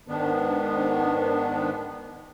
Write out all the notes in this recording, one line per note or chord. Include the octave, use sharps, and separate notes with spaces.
G#2 D#3 B3 D4